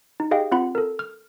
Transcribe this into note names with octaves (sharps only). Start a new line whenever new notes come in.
D#4
G4 G#4 D#5 F5 G5
C4 F4 F#5 B5
A4 A#4
F6